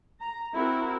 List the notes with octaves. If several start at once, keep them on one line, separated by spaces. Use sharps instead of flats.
A#5
C4 E4 F#4 A#4